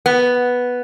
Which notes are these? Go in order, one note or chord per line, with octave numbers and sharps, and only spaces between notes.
B3